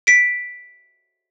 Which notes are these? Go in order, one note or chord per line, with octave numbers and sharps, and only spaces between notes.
B6 D7